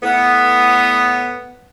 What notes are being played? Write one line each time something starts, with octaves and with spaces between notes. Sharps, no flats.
A2 B3